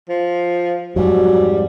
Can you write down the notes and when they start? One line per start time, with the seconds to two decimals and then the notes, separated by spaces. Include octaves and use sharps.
0.09 F3
0.96 F2 G#2 F#3 G3